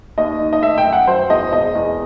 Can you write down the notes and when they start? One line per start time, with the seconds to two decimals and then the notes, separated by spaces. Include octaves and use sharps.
0.18 D#2 D#5
0.40 D#3
0.53 D#5
0.62 A3 E5
0.78 G5
0.85 F#2
0.92 F#5
1.07 F#3 C5
1.30 E2 D#5
1.52 E1 D#5
1.75 E2